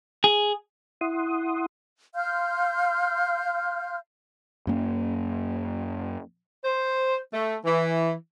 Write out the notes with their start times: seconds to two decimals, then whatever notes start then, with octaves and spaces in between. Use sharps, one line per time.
0.24 G#4
1.01 E4 F#5 C6 D#6
2.15 F5 C6 F6 G6
4.67 F#2 A#3 C#4
6.65 C5
7.34 A3
7.65 E3